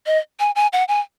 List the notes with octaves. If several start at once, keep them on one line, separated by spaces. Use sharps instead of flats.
D#5
G#5
G#5
F#5
G#5